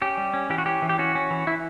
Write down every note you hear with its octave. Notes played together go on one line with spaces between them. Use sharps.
C#4 G4
G3
C#4
E3 G4
F#4
C#4 G4
E3
G4
C#4 F#4
C#4
E3
E3 E4